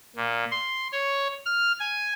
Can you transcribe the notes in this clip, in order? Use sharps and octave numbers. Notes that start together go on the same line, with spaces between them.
A#2
C6
C#5
F6
G#5